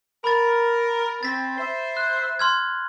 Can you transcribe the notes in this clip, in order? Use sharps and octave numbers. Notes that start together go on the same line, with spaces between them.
A#4 B5 A6
C4 A6 B6
C5 E5
F#6
C6 F6 G#6